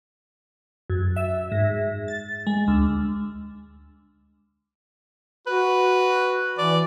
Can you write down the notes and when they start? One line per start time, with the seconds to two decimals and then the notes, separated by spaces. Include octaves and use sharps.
0.90 F#2
1.16 E5
1.52 G#2
2.08 A6
2.47 G#3
2.68 D2
5.47 F#4 B4
6.58 E3 D5